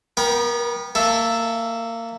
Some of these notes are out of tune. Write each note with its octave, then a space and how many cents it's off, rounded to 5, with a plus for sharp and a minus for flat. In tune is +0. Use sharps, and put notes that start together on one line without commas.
B3 -20 A#4 +25 G5 +0
A#3 -25 A4 +0 E5 +0